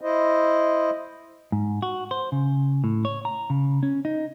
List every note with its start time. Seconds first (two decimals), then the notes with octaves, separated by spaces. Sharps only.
0.01 E4 C5 D#5
1.52 G#2
1.82 F#4
2.11 C5
2.32 C#3
2.84 A2
3.05 C#5
3.25 A#5
3.50 C#3
3.83 C#4
4.05 D#4